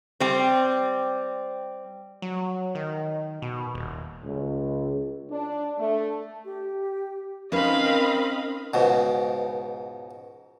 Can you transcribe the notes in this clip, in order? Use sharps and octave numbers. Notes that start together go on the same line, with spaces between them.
G3 C4
F#3
D#3
B2
D#1
C#2
D4
A3
G4
C4 C#4 D#4 A#4 B4 D#5 F5 B5
C#2 G#2 B2